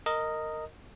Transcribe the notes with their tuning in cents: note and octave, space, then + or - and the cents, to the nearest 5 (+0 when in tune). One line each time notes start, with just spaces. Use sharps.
A#4 -15 D#5 +0